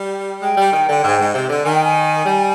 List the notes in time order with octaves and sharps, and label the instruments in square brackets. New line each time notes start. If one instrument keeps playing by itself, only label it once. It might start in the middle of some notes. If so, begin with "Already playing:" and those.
Already playing: [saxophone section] G3
[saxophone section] G#3 [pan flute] G5
[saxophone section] G3
D#3
D3
G#2
G#2
C3
D3
[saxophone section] D#3 [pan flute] G#5
[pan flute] G5
G#5
[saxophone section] G3